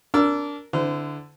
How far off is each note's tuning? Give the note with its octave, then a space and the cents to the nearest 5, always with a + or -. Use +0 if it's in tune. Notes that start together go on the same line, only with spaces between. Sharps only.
D4 -20 A#4 +0 E6 +20
D3 +0 E4 +0 C5 -40